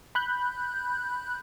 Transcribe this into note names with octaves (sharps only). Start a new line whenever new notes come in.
B5 F#6 G6